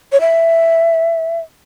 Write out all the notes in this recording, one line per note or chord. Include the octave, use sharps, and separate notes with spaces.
C#5
E5